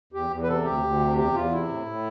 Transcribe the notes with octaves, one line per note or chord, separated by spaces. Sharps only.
E2 G4
E2
B4
C3 A4
D2 G4
D2
C3
E2 G4
E2 F4
C3 E4
A2
A2